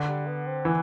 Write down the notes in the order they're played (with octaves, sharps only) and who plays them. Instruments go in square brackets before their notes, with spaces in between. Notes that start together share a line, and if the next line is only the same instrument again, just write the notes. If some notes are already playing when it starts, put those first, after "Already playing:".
Already playing: [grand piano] D3
[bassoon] G3
B3
C4
[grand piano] E3 [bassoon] B3